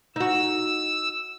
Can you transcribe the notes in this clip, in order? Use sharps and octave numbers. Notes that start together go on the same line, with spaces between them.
D#4 F#4 E6